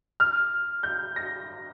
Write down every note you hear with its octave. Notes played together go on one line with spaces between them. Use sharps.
F6
G6
A#6